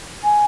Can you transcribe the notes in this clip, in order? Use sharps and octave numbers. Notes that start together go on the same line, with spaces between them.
G#5